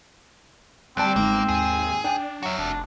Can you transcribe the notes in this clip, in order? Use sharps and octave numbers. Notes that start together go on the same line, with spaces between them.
D2 G3 C4 D5 A5 F#6
G1 G#2 A#3
D#2 G#4
D4 G5
F#3 F#4 E5
F1 D4